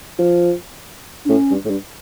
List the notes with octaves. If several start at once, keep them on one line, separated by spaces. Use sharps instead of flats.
F3
D4
A2 C#4
G2
A2
G2